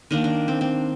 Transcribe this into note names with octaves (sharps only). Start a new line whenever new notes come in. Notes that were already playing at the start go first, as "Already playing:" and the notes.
D#3 A#3 D4
D4
C4
C4